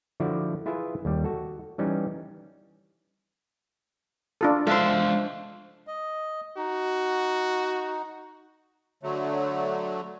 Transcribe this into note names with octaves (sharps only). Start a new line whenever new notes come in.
D3 F3 E4 F#4 D5
E4 F4 G#4 B4 E5
D#2 G3
F#4 A4
E3 G3 C#4 D#4
D4 F4 A4
F3 G#3 D4 A4 C5 E5 F5
D#5
D#4 F#4
D3 F#3 A3